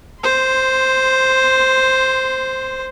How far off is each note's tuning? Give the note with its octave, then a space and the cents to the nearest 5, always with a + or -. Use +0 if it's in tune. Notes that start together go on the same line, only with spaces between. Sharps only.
C5 +0 C6 -20